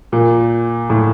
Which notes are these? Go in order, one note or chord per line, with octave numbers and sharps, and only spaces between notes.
A#2
A2